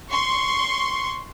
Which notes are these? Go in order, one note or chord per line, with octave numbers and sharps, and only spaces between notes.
C6 C#6